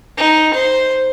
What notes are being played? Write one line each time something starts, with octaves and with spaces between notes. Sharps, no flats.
D#4
C5